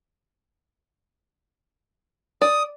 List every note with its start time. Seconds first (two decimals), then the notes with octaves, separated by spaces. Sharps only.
2.42 D5 D#6